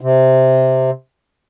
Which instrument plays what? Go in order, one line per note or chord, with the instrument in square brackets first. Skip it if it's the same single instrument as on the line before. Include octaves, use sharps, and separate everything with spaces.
[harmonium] C3